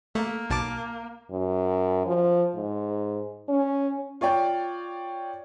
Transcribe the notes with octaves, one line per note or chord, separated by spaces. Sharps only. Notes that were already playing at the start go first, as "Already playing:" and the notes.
A3 A#3
B1 A5 D6
F#2
F3
G#2
C#4
F4 C#5 D5 G5